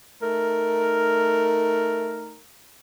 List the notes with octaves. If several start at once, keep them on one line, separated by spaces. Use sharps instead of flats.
A3 D#4 A#4